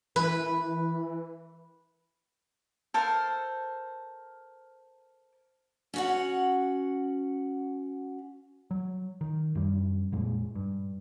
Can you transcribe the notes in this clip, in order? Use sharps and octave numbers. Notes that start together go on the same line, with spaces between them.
E3 B4
A4 A#4 C5 F5
C#4 F#4 F#5
F#3
D#3
F#2 G3
F2 A#2 G#3
G2